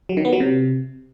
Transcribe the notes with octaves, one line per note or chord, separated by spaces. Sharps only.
F#3
D#3
B3
F#3
C3